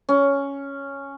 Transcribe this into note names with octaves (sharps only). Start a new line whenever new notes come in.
C#4